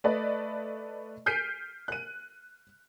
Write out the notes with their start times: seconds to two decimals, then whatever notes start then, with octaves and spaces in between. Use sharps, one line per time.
0.04 A3 B4 D5 D#5
1.26 F6 G6 B6 C7 D7 D#7
1.88 F#6 D#7